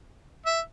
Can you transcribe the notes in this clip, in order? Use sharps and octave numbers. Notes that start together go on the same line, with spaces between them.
E5